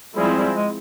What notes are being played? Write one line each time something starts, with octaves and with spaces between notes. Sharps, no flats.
F3 G3 G#3 C4 E4 G#4
G3
G#3